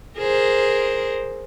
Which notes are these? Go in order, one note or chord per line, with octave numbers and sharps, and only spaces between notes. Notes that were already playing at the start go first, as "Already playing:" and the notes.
G#4 A#4 C5